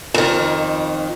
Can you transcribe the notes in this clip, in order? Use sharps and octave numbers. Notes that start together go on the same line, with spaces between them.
F2 D#3